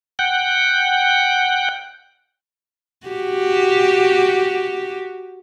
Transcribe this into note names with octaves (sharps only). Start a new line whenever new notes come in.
F#5 G5
F#4 G4